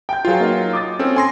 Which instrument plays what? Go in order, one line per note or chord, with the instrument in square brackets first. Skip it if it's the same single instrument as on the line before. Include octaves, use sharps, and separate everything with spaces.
[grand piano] G5 G6
[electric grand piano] F#3 F4 [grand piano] G#4 B4 F5
[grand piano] A#3 D#4
D6 D#6 A6
[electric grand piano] C4 C#4 A4
G#5 C6 A#6